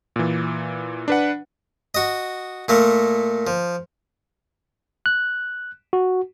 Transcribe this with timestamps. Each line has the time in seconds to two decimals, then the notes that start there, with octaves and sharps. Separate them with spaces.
0.16 A#2 E3
1.08 D4 B4 F#5
1.95 F#4 D#5
2.68 A#2 A3 A#3
3.47 F3
5.06 F#6
5.93 F#4